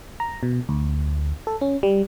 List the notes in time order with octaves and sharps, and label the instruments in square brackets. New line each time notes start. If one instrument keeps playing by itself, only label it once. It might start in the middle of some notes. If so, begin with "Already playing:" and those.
[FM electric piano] A#5
B2
D2
A4
C#4
G3